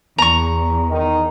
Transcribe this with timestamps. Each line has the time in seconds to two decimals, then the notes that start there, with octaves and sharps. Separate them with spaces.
0.18 E2 A#5 C#6
0.90 D#3 D#4